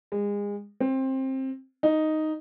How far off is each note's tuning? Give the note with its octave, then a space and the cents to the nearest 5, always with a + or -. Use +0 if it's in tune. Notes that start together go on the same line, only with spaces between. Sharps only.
G#3 -30
C4 +20
D#4 +0